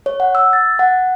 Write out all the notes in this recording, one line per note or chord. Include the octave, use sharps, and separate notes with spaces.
C#5
F#5
E6
A6
F#5